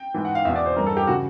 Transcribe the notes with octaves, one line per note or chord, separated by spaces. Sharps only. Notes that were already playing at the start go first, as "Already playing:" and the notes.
Already playing: G5
G#2 E3
F#5
F5
E2 B2 E5
D5
C5
G2 E3 A#4
A4
G4
C#3 E3 F#4